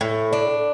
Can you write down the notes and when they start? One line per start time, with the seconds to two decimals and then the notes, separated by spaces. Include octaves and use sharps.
0.01 A2
0.33 D4